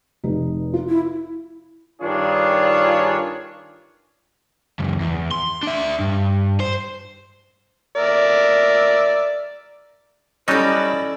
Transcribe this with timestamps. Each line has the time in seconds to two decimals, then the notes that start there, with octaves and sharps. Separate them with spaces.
0.24 F1 D#4
0.74 F4
0.89 E4
2.02 G2 D#3 D4 F4 G#4 C#5
4.79 C#2 F#2
5.00 E2
5.31 C6
5.63 D4 E5
6.00 G2
6.60 C5
7.96 A#4 D5 E5
10.48 F#3 G3 C#4 D#4 E4 A4 D5 D#5